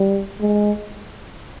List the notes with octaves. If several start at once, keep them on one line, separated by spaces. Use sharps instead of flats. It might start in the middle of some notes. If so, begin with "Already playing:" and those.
Already playing: G3
G#3